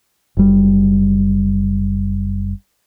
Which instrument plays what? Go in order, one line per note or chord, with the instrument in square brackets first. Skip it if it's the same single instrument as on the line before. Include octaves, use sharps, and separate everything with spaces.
[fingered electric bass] F#1 G3